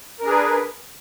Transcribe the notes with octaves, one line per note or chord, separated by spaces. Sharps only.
D4 G#4 A#4 B4